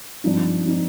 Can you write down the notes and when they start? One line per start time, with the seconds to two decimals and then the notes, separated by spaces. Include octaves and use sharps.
0.24 G2 F3 C4 D#4
0.65 F3 C4 D#4